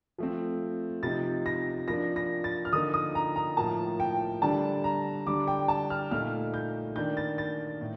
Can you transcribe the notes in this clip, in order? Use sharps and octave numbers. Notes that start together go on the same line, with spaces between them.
F3 A3 C4
C3 F3 C4 D#4 A6
A#6
F3 A#3 D4 A#6
A#6
A6
F6
D3 F3 A#3 D#4 D#6
D#6
A#5
A#5
A2 F3 A#3 A5
G5
D3 G3 D4 A5
A#5
D3 G3 D4 D6
G5
A5
F6
A#2 A3 D#4 F6
G6
D#3 A#3 D4 G6
A6
A6
A2